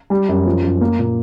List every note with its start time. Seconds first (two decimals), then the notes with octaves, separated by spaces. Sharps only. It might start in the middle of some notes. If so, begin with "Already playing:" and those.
0.10 G3
0.29 F#2
0.46 F3
0.63 F#2
0.81 A#3
0.99 A#2